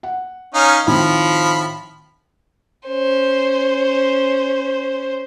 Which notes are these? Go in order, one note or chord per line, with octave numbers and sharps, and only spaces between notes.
F#5
C#4 D#4 F5
A2 D#3 F3 C4 B5
C#4 C5